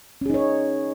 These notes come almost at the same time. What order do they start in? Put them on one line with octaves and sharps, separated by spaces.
C#4 G#4 D#4 C#5